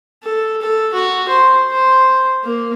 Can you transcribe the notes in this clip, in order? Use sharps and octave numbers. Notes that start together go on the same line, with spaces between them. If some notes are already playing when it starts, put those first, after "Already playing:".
A4
A4
F#4
C5
C5
A#3